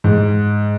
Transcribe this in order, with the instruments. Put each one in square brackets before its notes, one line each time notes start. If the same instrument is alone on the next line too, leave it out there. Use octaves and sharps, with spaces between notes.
[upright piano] G#2